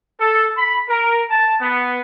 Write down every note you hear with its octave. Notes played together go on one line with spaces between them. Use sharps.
A4
B5
A#4
A5
B3